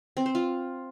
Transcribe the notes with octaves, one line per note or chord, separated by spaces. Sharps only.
C4
C5
F4